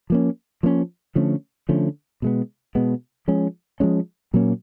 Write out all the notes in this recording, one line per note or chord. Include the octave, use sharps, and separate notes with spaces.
F3 A#3 C#4
F3 A#3 C#4
D3 F3 A3 C#4
D3 F3 A3 C#4
B2 G#3 B3
B2 G#3 B3
F3 G#3 C#4
F3 G#3 C#4
A#2 F#3 A#3 C#4